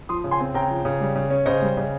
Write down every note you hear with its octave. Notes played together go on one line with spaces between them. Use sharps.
F3 C6 D#6
C#3
G#5 C6
C4
C#3 G5 A#5
F3
C#3
G3
C#3
C#4
C#3 C5 D#5
G3
C#3